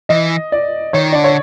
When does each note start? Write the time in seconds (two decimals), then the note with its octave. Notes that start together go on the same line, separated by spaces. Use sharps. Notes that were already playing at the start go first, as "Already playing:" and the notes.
0.09 E3 D#5
0.52 D5
0.93 D#3 C#5
1.13 D3 D5
1.24 C#5